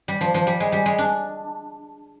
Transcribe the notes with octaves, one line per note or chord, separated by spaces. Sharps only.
G3
F3
F3
G3
G#3
G3
G#3
D4